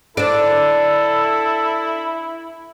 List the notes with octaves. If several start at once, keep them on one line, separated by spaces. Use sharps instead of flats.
D4 E4 A4 D5